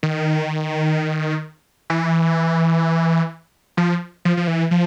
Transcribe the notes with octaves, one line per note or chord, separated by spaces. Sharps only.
D#3
E3
F3
F3
F3
E3
F3